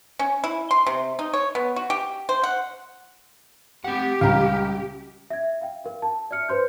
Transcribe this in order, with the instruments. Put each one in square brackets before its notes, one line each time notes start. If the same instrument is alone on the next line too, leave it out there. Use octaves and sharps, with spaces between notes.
[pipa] C#4
E4
C6
C3
D#4
C#5
B3
F#4
G4
C5
F#5
[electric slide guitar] C4 F#5 [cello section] G4
[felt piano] C#2 A#5 [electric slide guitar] G3 C#4 [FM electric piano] F5
[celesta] E5 G#6
F5 G5
A#4 F5
A5
D5 E5 F6 C#7
B4 C5 C6 G6